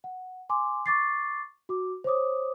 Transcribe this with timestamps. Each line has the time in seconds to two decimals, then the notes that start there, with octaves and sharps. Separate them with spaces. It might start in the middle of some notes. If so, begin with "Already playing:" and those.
0.04 F#5
0.49 G#5 C6 D6
0.86 C#6 D6 A6 C7
1.69 F#4 D6
2.04 C5 C#5 D6 D#6